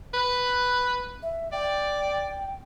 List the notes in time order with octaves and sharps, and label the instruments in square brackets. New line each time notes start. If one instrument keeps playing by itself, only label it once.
[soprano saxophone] B4
[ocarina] E5
[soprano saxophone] D5 [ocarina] G5